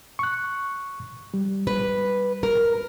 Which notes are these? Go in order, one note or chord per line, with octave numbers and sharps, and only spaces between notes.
C#6 F#6
G3
B4
A#4